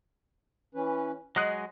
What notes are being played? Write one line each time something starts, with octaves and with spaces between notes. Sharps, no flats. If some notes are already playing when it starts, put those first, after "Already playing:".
E3 C#4 B4
F#3 G#3 D#5 G#5 F#6